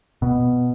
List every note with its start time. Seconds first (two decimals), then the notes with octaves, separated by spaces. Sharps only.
0.22 B2